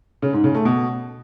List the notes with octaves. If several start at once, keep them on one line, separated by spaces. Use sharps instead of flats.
C#3
G#2
C#3
A3
B2